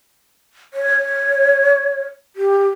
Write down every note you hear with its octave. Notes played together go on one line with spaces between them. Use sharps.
C#5
G4